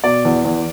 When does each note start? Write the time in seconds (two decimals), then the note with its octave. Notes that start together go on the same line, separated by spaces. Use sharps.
0.04 B2 D5
0.25 E2
0.45 E2